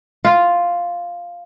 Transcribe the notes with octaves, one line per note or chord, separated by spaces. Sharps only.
F4